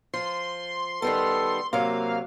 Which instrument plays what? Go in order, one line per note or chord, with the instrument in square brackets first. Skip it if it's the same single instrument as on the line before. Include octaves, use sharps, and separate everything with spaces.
[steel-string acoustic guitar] F3 [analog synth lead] C6
[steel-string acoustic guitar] D#3 G3 B3 [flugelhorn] A4
[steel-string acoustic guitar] C3 F#3 [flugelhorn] A#3 [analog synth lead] F5